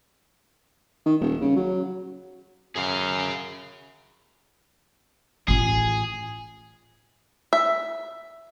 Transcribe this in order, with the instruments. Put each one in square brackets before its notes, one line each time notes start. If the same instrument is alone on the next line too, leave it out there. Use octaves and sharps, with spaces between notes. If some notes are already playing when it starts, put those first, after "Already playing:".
[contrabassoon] D#3
D#1
C#3
F#3
[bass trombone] F#2 [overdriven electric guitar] G#4 F5
[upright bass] A1 F4 [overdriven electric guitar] G#4
[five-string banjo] E5